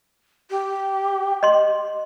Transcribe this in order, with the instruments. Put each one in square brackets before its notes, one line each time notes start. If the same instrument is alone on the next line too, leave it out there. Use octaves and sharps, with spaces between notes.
[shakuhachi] G4
[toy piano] D#5 C6